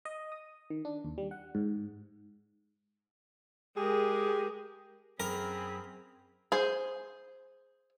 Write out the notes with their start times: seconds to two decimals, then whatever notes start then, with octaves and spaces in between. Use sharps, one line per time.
0.05 D#5
0.32 D#6
0.70 D#3
0.85 D4
1.05 D#2
1.18 G3
1.31 F#5
1.55 G#2
3.77 G#3 G4 G#4 A#4
5.20 F#2 C4 G#4 A#4 B5
6.52 G#4 C5